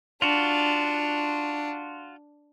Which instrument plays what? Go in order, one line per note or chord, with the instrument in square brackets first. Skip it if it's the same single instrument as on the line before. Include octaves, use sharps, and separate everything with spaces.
[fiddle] D4 [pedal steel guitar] F4 F#4